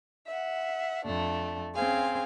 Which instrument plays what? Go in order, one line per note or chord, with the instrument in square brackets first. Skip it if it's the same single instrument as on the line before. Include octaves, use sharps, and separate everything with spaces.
[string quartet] E5 F#5
F2 A3 D4
C4 C#4 G#4 C5 F5 G#5